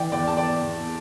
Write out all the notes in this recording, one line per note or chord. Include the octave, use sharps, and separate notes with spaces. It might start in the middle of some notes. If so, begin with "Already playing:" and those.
Already playing: E3 D5 G5
E2 D5 G5
A5
E2 D5 G5
E2